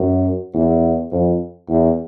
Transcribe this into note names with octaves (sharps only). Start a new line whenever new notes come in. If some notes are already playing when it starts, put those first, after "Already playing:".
Already playing: F#2
E2
F2
E2